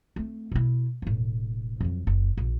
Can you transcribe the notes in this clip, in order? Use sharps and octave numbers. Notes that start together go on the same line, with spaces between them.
A3 C4
B2 E4
E1 A2
F2 F#3
F#1
A#1